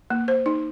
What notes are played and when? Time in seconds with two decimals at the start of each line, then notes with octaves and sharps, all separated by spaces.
0.10 A#3
0.28 C5
0.46 D#4